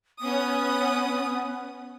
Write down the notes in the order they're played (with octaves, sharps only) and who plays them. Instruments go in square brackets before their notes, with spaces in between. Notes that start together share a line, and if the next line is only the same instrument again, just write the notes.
[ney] B3 [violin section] C#4 D#6